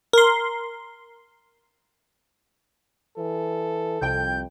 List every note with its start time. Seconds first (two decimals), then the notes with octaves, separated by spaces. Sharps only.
0.13 A#4 C6
3.17 E3 A4
4.02 C2 F2 G5 G6